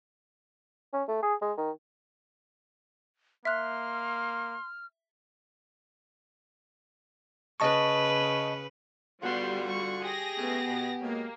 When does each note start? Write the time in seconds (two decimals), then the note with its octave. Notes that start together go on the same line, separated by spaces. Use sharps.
0.93 C#4
1.08 A3
1.22 G#4
1.42 G#3
1.57 D#3
3.45 A#3 E5 C6 F6 F#6
7.60 C#3 B4 D#5 A5 C#6
9.23 D3 G3 B3 F4 F#4 C6
9.68 C#6
10.02 G4 G#4 A#6
10.38 C#3 G#3 A3 B3
10.67 B2
11.02 B2 F#3 G#3 A#3